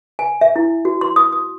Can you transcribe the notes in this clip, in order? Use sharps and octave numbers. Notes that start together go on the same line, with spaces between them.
G#5
E5
E4
F#4
C6
D#6
D#6